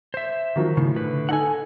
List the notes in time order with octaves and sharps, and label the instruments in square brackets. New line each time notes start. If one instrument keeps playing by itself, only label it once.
[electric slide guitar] C5 E5
[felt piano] D#3 F3 F#3
[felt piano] A2 [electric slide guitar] C#3
[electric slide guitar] D3 B4
[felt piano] D#4 A4 [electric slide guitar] F#5 G#5